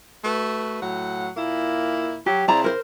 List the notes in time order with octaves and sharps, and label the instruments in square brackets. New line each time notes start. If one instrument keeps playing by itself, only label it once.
[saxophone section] A3 F#4 B4
A2 F#3 F#5
A#2 A#3 E4
[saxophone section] F#3 [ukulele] G4
[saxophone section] C#3 C4 E4 [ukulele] D5 A#5
[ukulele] A#4 C5